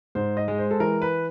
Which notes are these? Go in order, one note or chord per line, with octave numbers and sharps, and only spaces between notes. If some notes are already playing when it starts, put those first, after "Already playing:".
G#2 C5
D#5
G#3
C5
A4
E3 A#4
B4